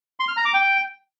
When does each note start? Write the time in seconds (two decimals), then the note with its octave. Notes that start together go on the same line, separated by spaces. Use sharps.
0.20 C6
0.28 F6
0.37 A#5
0.45 D6
0.54 G5